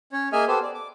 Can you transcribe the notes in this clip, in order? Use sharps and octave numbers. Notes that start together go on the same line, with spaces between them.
C#4 C#5
A#3 G#4 D#5 E5 G#5 F6
B3 G4 A4 C5
D5
D6